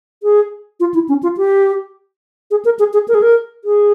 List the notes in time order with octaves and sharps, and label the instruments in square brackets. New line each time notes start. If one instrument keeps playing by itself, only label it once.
[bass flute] G#4
F4
E4
C#4
F4
G4
G#4
A#4
G#4
G#4
A#4
G#4
A#4
G#4